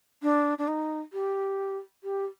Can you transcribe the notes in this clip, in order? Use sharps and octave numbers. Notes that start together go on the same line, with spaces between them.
D4
D4
D#4
G4
G4